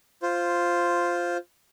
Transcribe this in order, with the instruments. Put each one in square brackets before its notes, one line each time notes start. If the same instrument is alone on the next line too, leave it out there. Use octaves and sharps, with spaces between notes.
[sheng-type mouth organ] F4 C5